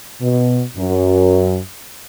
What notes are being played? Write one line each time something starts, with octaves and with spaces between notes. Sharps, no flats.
B2
F#2